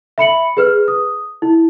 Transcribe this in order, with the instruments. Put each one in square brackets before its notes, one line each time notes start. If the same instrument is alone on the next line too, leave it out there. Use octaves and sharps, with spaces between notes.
[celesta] E5 B5 C#7 F#7
G#4 B4 F6
D#6
E4